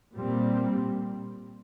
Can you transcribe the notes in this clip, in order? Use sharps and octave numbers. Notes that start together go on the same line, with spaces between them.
A#2 G3 C4